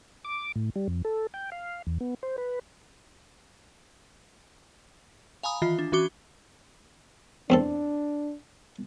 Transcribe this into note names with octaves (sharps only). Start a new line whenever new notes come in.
D6
A2
G3
F2
A4
G5
F5
E2
B3
C5
B4
F5 G#5 A#5 B5 D#6
D#3 E3 F4
D4
E3 C#4 F#4 D6 G7
E2 C4 D4 A4